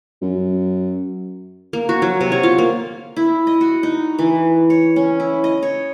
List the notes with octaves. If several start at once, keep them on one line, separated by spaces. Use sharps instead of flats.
F#2
A#3
F#4
F#3
C3
C#5
F4
A#3
E4
D#5
F#4
D#4
E3
C#5
C#4
E4
D#5
C#5